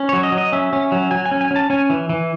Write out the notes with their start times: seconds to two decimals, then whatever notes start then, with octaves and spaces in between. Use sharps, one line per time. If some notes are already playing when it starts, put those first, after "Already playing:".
Already playing: C#4
0.09 F#3 C#5
0.23 D#5
0.32 F#3
0.38 D#5
0.52 C#4 E5
0.73 C#4
0.92 F#3
1.11 F#3 G#5
1.26 G#5
1.31 C#4
1.41 G#5
1.51 C#4 A5
1.70 C#4 G#5
1.90 E3
2.09 E3